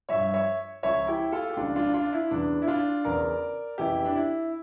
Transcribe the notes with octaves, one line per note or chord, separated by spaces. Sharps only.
G2 F3 C#5 E5
C#5 E5
C#2 C#3 F3 C#5 E5
E4 G4
F4 A4
G4
C#2 C#3 F3 D4 F4
D4 F4
D4 F4
E4
E2 C#3 E3 D4
E4
D4 F4
E2 C#3 E3 A#4 D5
F2 C#3 E3 E4 G4
D4
E4